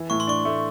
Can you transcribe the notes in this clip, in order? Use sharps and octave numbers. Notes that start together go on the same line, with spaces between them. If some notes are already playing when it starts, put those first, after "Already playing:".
Already playing: E3
A2 C#6
C6
D4 C#6
A3